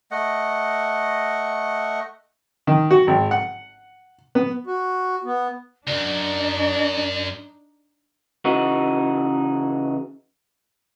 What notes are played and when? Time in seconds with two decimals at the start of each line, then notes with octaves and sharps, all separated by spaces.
0.11 A3 D#5 F#5
2.67 D#3
2.91 F#4
3.07 G#1
3.31 F#5
4.35 B3
4.67 F#4
5.25 B3
5.87 C#2 F#2 D4 D#4 D5
8.45 C#3 E3 D#4 F#4